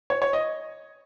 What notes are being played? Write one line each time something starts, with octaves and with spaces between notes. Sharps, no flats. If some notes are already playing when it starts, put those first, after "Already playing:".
C#5
C#5
D#5